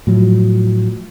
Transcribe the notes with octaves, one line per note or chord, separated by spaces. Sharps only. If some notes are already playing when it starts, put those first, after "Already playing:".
A2 F3 F#3